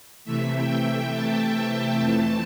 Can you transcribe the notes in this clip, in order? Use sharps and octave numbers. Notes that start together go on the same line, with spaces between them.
C3 E3 A3 E5
G5
G5
A5
G5
F2 E3 A3 A5